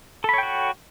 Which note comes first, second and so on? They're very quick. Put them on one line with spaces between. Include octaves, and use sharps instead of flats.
A4 B5 C#5 G5 F#4